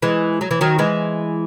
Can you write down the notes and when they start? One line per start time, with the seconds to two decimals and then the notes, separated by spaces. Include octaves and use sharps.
0.02 E3 G#3
0.41 F#3
0.51 E3
0.61 D#3 F#3
0.79 E3 G#3